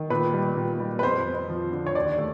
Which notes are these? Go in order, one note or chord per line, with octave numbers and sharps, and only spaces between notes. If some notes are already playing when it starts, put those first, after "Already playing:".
Already playing: D#3
A#2 B4
G3
A#2
G3
B4
F2 C5
F2
F3
D3
C#5
D#2 D5
A3